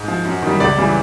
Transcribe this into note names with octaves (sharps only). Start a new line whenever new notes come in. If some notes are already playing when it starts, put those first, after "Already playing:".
Already playing: G#2
F3
F#2
D#3 G3
C#2 D5
C#3 E3 G3